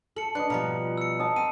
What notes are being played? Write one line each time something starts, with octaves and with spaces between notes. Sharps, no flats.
A4 C#7 F#7
D4 B4 D#5 F#6 C#7
B2 F3 G3 A#5 C#7
E6 C#7
D#5 A5
C4 D#7